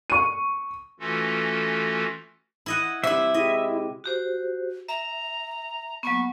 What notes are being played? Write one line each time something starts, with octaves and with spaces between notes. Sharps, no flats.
C#6 D#7
E3 A3 C#4 F4 F#4 A4
E4 D#5 F#5
C3 G3 E4 E5
G#3 E4 G4 D#5
F#4 G4 C5
E5 A#5
F#3 A#3 B3 C#6